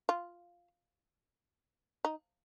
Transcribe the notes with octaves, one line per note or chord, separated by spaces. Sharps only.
F4
D#4